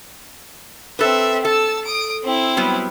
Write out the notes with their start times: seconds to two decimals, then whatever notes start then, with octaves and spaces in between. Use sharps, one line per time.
0.99 C4 A4 B4 E5
1.45 A4 A5 E6
1.85 D#6 D7
2.24 C4 E4
2.57 F#3 G3 B3